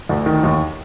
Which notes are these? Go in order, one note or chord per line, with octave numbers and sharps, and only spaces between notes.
D2
D#3
D#2